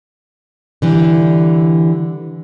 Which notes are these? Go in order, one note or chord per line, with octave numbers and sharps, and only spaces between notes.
D3 E3 G3